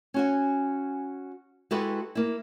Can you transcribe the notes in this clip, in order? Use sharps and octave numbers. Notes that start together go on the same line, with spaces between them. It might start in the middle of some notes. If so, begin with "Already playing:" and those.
C#4 F#4 G#5
G#3 E4 F#4 G4 A4 B4
A#3 E4